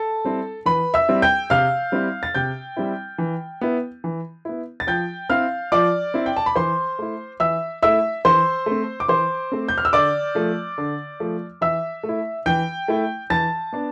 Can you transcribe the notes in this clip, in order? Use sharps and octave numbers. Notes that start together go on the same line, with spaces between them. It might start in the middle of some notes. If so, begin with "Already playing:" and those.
Already playing: A4 A5
G3 C4 E4
E3 B4 B5
E5 E6
G3 C4 E4
G5 G6
C3 F5 F6
G3 C4 E4
A6
C3 G5 G6
G3 C4 E4
E3
B3 E4
E3
B3 E4
A6
F3 G5 G6
C4 E4 F5 F6
F3 D5 D6
C4 E4
G5
A5
B5
E3 C5 C6
A3 E4
E3 E5 E6
A3 E4 E5 E6
E3 C5 C6
A3 C4
D6
E3 C5 C6
A3 C4
G6
F6
E6
D3 D5 D6
F3 A3
D3
F3 A3
E3 E5 E6
A3
E4
E3 G5 G6
A3 E4
E3 A5 A6
B3 D4